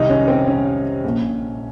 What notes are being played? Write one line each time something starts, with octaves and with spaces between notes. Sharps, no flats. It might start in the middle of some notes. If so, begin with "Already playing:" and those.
Already playing: C2 C3 D#3 D#4
C#4
C4
C#4
A#1 A#2